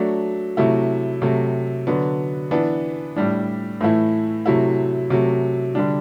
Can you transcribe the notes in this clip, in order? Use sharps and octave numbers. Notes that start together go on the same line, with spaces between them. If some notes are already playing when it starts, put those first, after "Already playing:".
Already playing: F#3 A3 D4
C3 F#3 A3 E4
C3 F#3 A3
D3 F#3 B3 D4
E3 B3 D4
A2 G3 D4
A2 E3 A3 E4
C3 F#3 A3 E4
C3 F#3 A3
D3 G3 D4